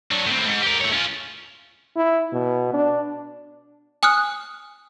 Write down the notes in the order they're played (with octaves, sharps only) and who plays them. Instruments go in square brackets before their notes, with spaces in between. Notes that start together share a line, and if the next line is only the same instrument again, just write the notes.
[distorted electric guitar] F#3 D4
A2 C4
G#2
G4 A#4
A3 C#5
C#4 F4
[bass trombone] E4
B2
D4
[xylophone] G#5 D#6 F6 F#6